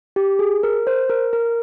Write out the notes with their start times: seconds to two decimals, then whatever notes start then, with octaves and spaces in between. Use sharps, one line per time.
0.16 G4
0.39 G#4
0.63 A#4
0.87 C5
1.10 A#4
1.33 A#4